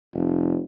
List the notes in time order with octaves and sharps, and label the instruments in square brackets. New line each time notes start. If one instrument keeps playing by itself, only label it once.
[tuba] F1